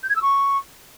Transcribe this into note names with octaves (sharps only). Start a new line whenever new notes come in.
G6
G#6
E6
C#6